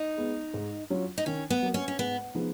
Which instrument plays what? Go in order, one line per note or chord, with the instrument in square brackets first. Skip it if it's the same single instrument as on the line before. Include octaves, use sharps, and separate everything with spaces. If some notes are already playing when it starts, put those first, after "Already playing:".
Already playing: [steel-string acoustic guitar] D#4
[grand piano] G#3 B3
G#2
F#3 C#4 F4
[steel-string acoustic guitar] D#4
[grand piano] D#3 [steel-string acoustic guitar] C#4
[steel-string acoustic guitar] B3
[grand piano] F#3 A#3
[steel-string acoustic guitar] C#4
C#4
[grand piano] G#2 [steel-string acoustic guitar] B3
[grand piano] F3 G#3 B3 D#4